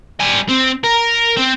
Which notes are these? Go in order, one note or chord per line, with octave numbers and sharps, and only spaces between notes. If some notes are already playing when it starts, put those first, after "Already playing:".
G3 G#5
C4
A#4
C4